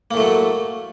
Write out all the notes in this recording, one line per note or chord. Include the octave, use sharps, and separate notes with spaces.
A2 F#3 A3 A#3